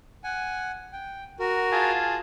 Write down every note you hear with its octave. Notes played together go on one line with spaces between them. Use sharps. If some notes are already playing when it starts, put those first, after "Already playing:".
F#5 G#5
G5
F#4 A#4
F4 G#4 A5